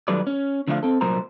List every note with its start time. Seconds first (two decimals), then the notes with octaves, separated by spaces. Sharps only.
0.08 D#3 F#3 G3 A4 B4 D5
0.27 C#4
0.68 D3 F3 A3 D4 A4 F5
0.83 C4 A4
1.01 C2 A#2 F#3 A#4 C5 A#5